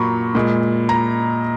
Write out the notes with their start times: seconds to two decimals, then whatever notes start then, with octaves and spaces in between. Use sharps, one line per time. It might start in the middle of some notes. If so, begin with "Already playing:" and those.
Already playing: A#2 F#3 A#5 B5 C#6
0.35 A#2 G#3
0.89 A#5